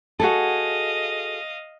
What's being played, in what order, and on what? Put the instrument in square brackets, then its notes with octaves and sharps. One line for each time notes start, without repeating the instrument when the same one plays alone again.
[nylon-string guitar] F#4 G#4 A4 [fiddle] D#5 F5